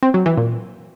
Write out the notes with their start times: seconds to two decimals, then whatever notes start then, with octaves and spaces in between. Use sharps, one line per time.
0.03 C4
0.14 F#3
0.26 E3
0.37 A#2